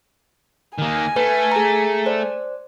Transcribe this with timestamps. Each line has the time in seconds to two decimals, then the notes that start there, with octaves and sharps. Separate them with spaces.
0.78 D#3 A#3 G#5
1.16 A3 B4
1.52 G#4 A#5
2.06 C5 D5